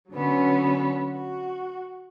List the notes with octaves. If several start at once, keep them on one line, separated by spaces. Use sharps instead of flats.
D3 F#3 B3 C#4
F#4